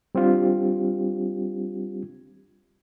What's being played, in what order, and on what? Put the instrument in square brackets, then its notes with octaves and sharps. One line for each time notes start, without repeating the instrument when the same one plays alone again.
[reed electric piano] G3 C4 D4 F4 G4